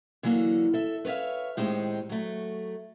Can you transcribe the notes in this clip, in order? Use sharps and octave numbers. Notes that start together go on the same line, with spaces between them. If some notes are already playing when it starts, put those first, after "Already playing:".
D3 E3 F#3 A#3
A4 E5
B4 C#5 D5 E5 F5
A2 D#3 G#3 C4 D#4 G4
F#3 A3